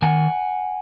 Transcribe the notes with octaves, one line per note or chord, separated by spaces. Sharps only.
D#3 F#5 G#5